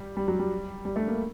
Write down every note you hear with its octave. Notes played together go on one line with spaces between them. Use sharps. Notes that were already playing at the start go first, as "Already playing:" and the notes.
Already playing: G3
G3
F#3
G3
G3
A3
A#3